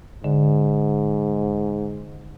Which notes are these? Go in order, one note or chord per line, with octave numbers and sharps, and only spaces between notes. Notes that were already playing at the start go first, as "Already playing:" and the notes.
G#2 D3